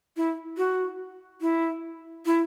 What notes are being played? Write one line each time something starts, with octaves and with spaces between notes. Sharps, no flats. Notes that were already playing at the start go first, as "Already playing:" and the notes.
E4
F#4
E4
E4